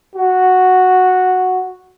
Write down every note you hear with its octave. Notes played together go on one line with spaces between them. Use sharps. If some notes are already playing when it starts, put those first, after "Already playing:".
F#4